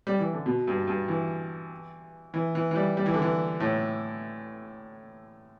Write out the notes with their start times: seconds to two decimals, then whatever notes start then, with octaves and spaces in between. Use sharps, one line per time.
0.07 G3
0.19 E3
0.33 D3
0.46 B2
0.68 G2
0.87 G2
1.08 E3
2.34 E3
2.55 E3
2.71 E3
2.75 G3
2.97 G3
3.06 E3
3.14 D3
3.22 E3
3.60 A2